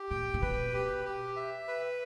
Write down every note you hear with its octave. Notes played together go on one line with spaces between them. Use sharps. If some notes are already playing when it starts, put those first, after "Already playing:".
Already playing: G4
A#2 G5
A#2
B2 B4
G4
G4
E5
B4